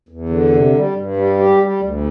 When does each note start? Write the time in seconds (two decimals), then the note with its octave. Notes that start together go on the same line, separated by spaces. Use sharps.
0.09 E2
0.29 D3
0.52 C3
0.73 G3
0.95 G2
1.17 G3
1.38 G4
1.60 G3
1.81 D2